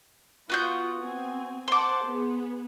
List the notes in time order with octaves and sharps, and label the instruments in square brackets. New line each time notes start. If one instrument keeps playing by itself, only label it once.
[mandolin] B3 F#4 G6 [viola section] F4
[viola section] C4 G#5
[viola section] C5 F#5 A5 [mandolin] C6 D6
[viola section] B3 G#4